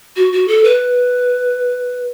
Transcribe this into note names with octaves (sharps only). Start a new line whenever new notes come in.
F#4
F#4
A4
B4